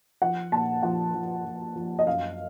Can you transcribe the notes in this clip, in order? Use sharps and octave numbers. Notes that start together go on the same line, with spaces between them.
F3 F#5
A#2 A5
F3 F#5
F3
F3
F3
D#5
F#2 F5